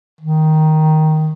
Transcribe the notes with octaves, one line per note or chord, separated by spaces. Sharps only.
D#3